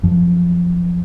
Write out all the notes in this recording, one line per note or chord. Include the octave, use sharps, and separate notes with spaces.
F#2 F3